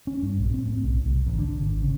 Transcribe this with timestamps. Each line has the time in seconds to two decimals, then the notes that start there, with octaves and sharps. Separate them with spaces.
0.07 C#4
0.23 G2
0.39 A#1
0.54 C4
0.66 A2
0.83 B1
1.06 C2
1.26 A1
1.39 D3
1.61 G#1
1.82 C#3